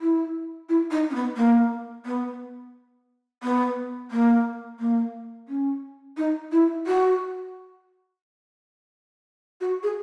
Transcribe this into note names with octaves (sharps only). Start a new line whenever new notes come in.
E4
E4
D#4
C#4
B3
A#3
B3
B3
A#3
A#3
C#4
D#4
E4
F#4
F#4
G#4